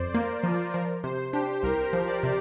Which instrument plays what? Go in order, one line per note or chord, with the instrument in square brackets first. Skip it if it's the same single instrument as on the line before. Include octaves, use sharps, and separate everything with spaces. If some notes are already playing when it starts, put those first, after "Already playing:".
Already playing: [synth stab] F2 [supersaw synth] C5 D5
[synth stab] A#3 [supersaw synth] A#4
[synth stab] F3 [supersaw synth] F4
[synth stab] F3 [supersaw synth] A#4
[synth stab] C3 [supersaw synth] C5
[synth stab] D4 [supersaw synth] G4
[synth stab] C2 [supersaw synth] A#4
[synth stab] F3
[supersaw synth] D5
[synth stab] C3